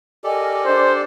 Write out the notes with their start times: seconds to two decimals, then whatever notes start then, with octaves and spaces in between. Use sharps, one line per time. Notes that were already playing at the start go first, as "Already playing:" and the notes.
0.24 G4 A4 A#4 D5 D#5 G#5
0.65 D4 C5